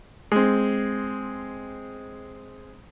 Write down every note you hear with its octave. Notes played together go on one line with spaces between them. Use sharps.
G#3 C4